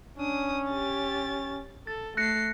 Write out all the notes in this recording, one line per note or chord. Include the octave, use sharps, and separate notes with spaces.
C#4 D4 D#6
G4 A6
A4 A6
A3 F#6 A#6 C7 C#7